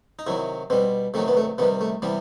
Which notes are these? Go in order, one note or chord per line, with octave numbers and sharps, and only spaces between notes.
D#4
C3 D#3 F#3 E4
B2 G3 C4
C3 D#3 F#3 A3
B3
A3
C3 D#3 G3 B3
A3
C3 E3 G3 B3